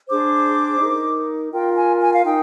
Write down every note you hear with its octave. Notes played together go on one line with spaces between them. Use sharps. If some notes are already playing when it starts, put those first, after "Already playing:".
D4 G#4 C5 D6
D#4 A#4
F4 A#4 G5
G#5
G#5
F5
D#4 A#4 G5